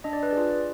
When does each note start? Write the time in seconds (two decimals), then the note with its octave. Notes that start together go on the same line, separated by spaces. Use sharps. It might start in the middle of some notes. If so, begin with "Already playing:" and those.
0.04 D4 D#5
0.13 D5
0.23 B4
0.31 G#4 D5
0.37 F4